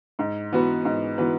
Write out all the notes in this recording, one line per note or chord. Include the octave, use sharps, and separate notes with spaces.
G#2
E3 B3 F#4 B4
G#2
E3 B3 F#4 B4